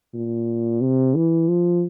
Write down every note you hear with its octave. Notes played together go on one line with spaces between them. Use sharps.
A#2
C3
E3
F3